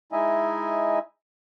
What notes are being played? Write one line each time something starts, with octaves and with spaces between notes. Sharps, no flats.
G#3 D#4 E4 D#5 E5 G#5